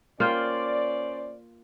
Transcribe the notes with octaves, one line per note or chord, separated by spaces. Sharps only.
A#3 C#4 F4 C5 D5 G5